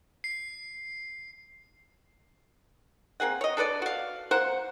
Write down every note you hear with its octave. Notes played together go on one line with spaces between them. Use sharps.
C7
A#3 C4 G#4 F#5
C#5 D#5
D4 A4 B4 D5
F#4 F5
A#3 C5 F#5